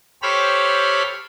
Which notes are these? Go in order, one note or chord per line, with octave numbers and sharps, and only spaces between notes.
G4 A4 C5 C#5 B5 F6